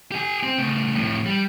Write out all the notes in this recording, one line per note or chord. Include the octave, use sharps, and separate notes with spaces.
G4 G#5
C4
C#3 A3
F2 A2
G3